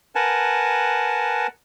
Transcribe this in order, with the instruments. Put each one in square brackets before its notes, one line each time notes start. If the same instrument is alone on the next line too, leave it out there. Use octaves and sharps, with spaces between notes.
[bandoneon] A#4 B4 F#5 G#5 A5